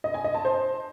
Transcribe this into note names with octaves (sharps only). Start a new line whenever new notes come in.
D#5
G#5
D#5
A5
C5